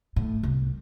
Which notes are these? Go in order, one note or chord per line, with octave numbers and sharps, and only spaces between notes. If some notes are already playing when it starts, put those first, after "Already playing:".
A2
C2